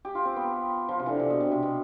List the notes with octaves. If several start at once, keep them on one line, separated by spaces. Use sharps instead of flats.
G4
F4
C4
B3
F3
C3
D3 E3
C3
B2
C3
C3
B2